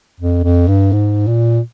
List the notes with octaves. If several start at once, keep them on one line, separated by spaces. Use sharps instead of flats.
F2
F2
G2
G#2
A#2